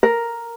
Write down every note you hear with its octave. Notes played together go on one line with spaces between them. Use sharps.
A#4